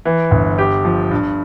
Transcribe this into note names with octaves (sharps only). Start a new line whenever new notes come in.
E3
G1
G4
F3
G2